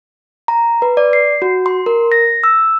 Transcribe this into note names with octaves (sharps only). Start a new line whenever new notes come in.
A#5
B4
D5
C7
F#4
C6
A#4
A#6
E6